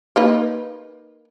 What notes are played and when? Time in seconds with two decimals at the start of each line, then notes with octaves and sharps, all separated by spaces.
0.16 A#3 D#4 B4